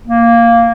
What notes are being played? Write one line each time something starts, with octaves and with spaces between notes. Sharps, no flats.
A#3